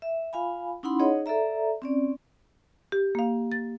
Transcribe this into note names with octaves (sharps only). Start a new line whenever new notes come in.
E5
F4 F5 G#5 B5
C#4 D#4 E4 F#5 B5 C6
D#4 G#4 C#5 D#5 F#5
A4 D5 E5 A#5
C4 C#4 D5
G4
A#3 F5
A6